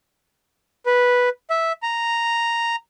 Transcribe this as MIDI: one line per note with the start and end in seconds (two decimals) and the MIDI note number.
0.86 1.29 71
1.50 1.72 76
1.83 2.76 82